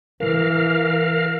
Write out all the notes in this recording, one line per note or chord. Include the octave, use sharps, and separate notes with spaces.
E3 A#4 F5